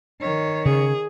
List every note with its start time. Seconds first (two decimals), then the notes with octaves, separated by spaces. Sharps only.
0.21 D#3 C#5
0.66 C#3 G#4